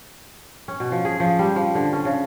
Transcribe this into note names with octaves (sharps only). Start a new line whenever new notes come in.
C#4
B2
F3
G#4
F3
G3
F3
D3
C#4
C#3